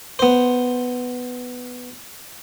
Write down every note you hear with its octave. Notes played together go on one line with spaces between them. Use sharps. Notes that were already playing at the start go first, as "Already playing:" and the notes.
B3 C5